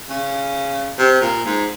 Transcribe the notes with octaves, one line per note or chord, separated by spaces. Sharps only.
C#3
C3
A#2
G#2